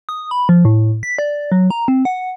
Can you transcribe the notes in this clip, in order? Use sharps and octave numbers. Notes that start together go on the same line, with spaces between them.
D#6
B5
F3
A2
B6
D5
F#3
A#5
C4
F#5